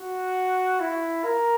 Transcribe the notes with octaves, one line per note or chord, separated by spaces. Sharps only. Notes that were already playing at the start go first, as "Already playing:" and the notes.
Already playing: F#4
E4
A#4